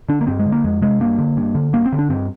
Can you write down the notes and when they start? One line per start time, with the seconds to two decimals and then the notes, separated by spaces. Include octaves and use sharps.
0.09 D3 D4
0.21 A#3
0.27 G2 C4
0.39 G#3
0.46 D3
0.52 A#3
0.64 F2 G#3
0.82 C3 G#3
1.00 G2 A#3
1.19 D3
1.37 G2
1.55 D3
1.73 G2 A#3
1.86 C4
1.93 D3
1.99 D4
2.10 G2 C4